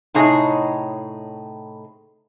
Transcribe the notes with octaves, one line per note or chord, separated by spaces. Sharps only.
A2 C3 D#4 G#4 C#5 D#5